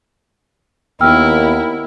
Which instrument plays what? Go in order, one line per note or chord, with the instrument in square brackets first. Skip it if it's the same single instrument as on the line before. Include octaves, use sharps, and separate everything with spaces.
[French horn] D#2 [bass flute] B3 [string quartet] E4 A#4 [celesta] G5 E6 F6